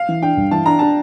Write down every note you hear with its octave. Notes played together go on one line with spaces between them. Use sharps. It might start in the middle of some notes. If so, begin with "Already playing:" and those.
Already playing: F5
E3
D4 G5
G2
E3 A5
D4 A#5
D4 A5